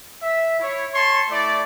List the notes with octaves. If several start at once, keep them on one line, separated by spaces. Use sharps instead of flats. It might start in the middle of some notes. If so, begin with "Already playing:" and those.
E5
E4 C#5
C#5 A5 C6 C#6
A3 E4 D5